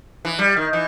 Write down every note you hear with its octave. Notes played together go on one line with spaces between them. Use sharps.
E3
G3
D#3
E3